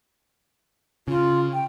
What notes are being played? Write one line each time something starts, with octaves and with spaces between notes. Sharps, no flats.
C#3 F4
G5